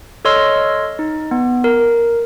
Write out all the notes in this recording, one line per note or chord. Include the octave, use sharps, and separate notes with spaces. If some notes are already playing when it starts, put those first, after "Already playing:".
A4 C#5 D#5 C6 E6 F6
D#4
B3
A#4